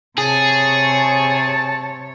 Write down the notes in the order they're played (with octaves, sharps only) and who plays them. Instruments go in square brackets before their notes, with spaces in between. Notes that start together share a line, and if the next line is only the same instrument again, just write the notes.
[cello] C3 C#5 [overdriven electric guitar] G#4 [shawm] A5